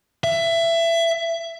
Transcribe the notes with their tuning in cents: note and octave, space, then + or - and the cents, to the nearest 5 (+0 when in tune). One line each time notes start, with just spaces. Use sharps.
E5 +20